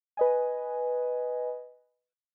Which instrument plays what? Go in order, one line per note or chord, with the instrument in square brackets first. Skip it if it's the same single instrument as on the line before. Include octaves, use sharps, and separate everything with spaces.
[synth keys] B4 D#5 G#5